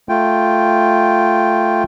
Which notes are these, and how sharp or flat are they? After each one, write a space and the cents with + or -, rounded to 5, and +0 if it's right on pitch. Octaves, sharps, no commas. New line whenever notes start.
A3 +0 F4 +0 G5 +0